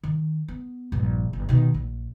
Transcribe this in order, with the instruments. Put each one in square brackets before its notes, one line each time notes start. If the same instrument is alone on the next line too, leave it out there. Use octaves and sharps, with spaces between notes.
[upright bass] D#3
B3
A#1 G2
G1
B2 D#3
A#1